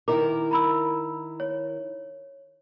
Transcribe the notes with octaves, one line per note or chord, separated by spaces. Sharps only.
D#3 E4 A#4 D6
A#5 B5 E6
C#5